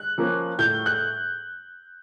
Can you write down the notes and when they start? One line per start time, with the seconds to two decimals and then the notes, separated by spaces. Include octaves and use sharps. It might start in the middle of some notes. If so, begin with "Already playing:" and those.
Already playing: F#6
0.18 F3 A#3 C#4
0.59 A2 G6
0.86 F#6